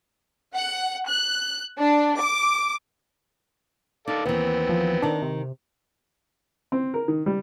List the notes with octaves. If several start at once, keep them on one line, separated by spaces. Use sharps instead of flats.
F#5
F#6
D4
D6
D#4 A4 D5 F5
D#2 E3 B3 C4
F3
D#3 D4 D#4
C3
C4
A#4
D#3
G3